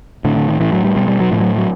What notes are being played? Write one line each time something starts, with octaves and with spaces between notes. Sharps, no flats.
A2 D3
D3
D#3
A2 E3
F#3
G3
B2 G3
G3
F#3
A2 F3
F#3
F#3